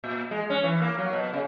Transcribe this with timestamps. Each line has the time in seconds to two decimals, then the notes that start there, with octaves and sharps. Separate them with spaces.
0.04 A#2
0.31 G#3
0.50 C#4
0.63 E3
0.81 A#3
0.98 F#3
1.13 B2
1.33 C#3